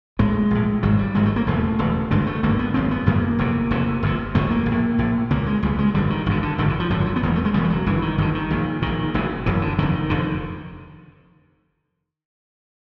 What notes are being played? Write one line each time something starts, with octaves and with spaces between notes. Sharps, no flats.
A#1 A2 G#3
A#1 A2
G#1 G#2 F#3
G3
G#1 G#2 G#3
A3
A#3
E1 E2 C#3 A3
E1 E2 C#3
G#1 G2 D3 G#3
A3
G#1 G2 D3 A#3
B3
G#1 F#2 C#3 C4
B3
G#1 F#2 C#3 A#3
F1 E2 C3
F1 E2 C3
G1 F2 C3
G1 F2 C3 A3
A#3
A#1
A2
A#1 A2
C#2 C#3 A#3
G#3
C#2 C#3 G3
G#3
G#1 G2 D3 G3
D#3
G#1 G2 D3 D#3
D3
G#1 F#2 D3 D#3
E3
F3
G#1 F#2 D3 F3
F3
F#3
B3
E1 E2 C#3 A#3
A3
G#3
E1 E2 C#3 G3
F3
F#3
G1 G2 D3 E3
D#3
G1 G2 D3 D#3
D#3
A#1 A#2
A#1 A#2 D#3
F#1 F#2 C#3
F#1 F#2 C#3 E3
D3
F1 F2 D3 D#3
F1 F2 D3